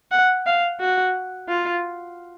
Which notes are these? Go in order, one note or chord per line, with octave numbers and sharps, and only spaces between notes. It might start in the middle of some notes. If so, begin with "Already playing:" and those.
F#5
F5
F#4
F4